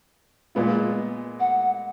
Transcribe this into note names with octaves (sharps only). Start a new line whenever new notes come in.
A#2 G#3 B3 F4
F#5